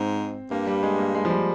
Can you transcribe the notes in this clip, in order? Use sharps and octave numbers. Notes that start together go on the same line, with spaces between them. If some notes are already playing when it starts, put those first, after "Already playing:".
Already playing: G#2 C4
G2 A#3
G3
G#3
A#3
G#3
F3
G3